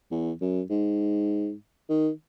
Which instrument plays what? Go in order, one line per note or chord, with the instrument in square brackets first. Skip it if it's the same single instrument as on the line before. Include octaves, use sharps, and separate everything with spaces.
[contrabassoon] E2
F#2
G#2
D#3